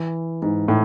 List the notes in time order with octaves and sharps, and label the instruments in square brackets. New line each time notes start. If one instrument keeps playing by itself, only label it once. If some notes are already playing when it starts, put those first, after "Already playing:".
Already playing: [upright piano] E3
G#2
A2